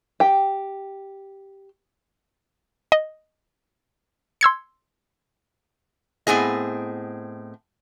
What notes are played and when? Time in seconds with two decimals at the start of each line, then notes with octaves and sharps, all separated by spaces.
0.20 G4 G5
2.92 D#5
4.41 C6 E6 G#6 C#7
6.27 A2 B3 C4 G#4 D#5